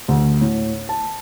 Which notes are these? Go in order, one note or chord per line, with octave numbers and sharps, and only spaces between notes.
D2
A2
A5